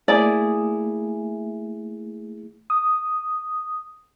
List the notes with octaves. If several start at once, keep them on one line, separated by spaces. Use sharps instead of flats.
A3 A#3 E4 G#4 D5
D#6